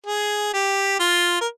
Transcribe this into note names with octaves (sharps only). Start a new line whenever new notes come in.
G#4
G4
F4
A#4